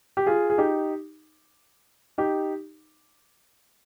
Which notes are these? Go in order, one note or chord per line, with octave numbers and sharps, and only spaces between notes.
G4
F4 G#4
G#4
D#4 G4
D#4 G4